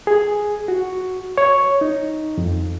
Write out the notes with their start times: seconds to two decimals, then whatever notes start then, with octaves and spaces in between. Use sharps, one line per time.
0.07 G#4
0.68 F#4
1.38 C#5
1.81 D#4
2.38 F2